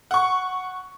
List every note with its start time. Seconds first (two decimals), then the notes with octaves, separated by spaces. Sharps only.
0.11 F#5 C#6